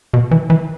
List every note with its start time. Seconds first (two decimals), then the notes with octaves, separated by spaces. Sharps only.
0.14 B2
0.31 E3
0.50 E3